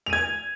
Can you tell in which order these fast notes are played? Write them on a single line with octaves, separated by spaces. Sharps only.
F7 D#7 G#6